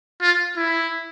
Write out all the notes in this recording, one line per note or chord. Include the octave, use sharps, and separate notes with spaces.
F4
E4